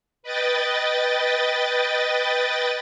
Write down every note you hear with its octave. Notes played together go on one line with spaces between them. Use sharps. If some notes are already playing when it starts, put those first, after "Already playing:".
B4 D#5 G5 A6